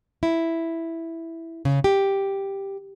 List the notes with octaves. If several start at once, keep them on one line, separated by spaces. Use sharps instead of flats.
E4
C#3
G4